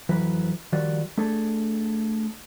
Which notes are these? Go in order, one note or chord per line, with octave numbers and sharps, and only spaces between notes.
F2 E3 F#3 B4
D#3 F3 G3 F#4 D5
A3 D4 G#4 A4